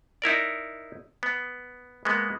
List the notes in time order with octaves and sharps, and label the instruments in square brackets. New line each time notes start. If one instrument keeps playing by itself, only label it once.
[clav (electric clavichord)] D#4 E4 A#4 D5
B3
G#3 A#3 B3